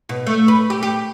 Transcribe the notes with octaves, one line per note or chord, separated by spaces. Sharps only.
B2
A3
B4
G4
G4